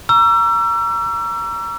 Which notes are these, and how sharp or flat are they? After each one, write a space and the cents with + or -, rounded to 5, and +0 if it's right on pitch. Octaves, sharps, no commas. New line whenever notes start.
A#5 +10 C#6 +45 E6 +35